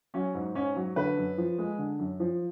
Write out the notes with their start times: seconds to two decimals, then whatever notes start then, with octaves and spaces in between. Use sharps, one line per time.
0.14 F#3 C#4
0.35 G#2
0.55 G#2 C#4
0.76 F#3
0.96 D3 B4
1.17 F#2
1.38 F3
1.58 G#3
1.79 D3
1.99 F#2
2.20 F3